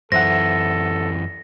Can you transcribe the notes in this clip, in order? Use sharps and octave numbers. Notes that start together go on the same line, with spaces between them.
F#2 E3 A4 C5 E5 F#5 A#6